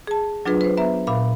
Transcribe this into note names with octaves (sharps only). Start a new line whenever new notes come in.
G#4 A5
F#3 D4 F4 G#4 B4
B4 C5
B3 B4 E5 A#5
A#2 E5 F5 B5